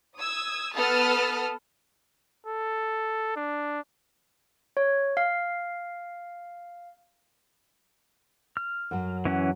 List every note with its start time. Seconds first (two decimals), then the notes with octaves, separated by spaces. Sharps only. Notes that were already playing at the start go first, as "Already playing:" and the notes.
0.18 D#6 E6 G#6
0.76 B3 A4 B4 A5 D#6 F6
2.46 A4
3.36 D4
4.77 C#5
5.17 F5
8.57 F6
8.91 F#2 F#3
9.25 E3 C#4 F#5